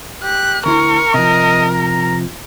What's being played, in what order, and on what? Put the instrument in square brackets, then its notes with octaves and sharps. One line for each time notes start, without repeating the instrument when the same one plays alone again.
[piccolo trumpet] G4 [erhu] F#6
[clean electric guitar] D2 E4 C6 [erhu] A#4 [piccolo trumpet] C#6
[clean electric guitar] C3 F3 [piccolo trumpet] D#5
[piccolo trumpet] A#5